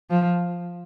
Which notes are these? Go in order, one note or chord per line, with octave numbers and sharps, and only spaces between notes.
F3